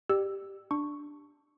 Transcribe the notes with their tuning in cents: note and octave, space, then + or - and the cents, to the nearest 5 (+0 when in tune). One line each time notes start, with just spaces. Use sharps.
G4 +0 D5 +30 E6 +0
D4 +0 C#6 +0